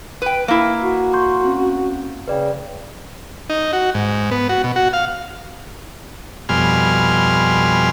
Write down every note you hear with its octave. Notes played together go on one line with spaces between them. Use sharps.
B4 G5
A#3 E4
F#4
C6 C#6 G6
C4 C#4
C#3 B4 D5 G5
D#4
F#4
G#2
B3
F#4
B2
F#4
F5
F2 B2 G3 G#5 C6 F6